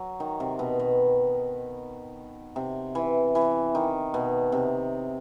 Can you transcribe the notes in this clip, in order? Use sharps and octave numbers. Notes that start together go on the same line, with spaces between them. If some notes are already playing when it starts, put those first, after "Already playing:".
Already playing: F#3
D#3
C3
B2
B2
C3
E3
E3
D#3
B2
C3